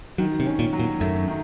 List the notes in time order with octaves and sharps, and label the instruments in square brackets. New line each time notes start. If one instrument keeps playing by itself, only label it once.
[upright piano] D#3 [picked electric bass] F#3
[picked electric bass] C3
[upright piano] C#4
[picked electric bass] A#2
[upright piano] F#3
[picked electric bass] A#2
[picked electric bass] F#2 [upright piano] A3
[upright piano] D#3